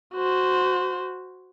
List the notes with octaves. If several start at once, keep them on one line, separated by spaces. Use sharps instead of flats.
F#4 C5